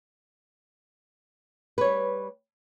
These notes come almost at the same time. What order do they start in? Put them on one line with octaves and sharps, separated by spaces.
B4 C#5 G3